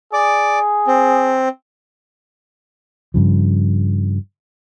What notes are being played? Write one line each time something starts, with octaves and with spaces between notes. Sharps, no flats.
G#4 D5 D6
C4
G2 C#3 F3